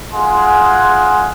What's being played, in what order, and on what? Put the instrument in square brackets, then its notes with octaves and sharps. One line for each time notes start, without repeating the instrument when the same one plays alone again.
[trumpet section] G#3 F4 G#4 F#5 C6